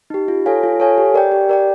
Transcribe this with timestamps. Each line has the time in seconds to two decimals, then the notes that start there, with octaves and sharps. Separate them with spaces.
0.10 D#4 G4
0.28 F4
0.46 A4 C#5 F5 G#5
0.63 F4
0.80 A4 C#5 F5 G#5
0.98 G4
1.14 A#4 D5 G5
1.32 G4
1.49 A#4 D5 G5